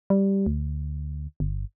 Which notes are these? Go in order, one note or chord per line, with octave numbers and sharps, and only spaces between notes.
G3
D2
G1